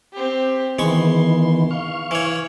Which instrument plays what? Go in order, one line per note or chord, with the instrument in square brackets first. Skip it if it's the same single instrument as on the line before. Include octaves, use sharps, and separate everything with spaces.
[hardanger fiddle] C4 G4
[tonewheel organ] D#3 E3 B3 [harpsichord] G#3 C#6 [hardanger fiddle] C6
[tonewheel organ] F5 C#6
[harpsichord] E3 C#5